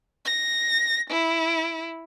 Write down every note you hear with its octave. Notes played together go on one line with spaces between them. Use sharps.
A#6
E4